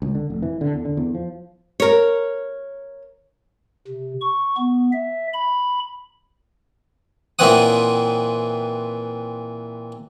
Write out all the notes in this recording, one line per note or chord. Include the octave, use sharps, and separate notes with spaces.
C#2
D3
F1
E3
D3
E2
D3
E2
F3
A#4 C#5
C3
C#6
B3
E5
B5
A#2 E3 C4 C#5 F#5 D#6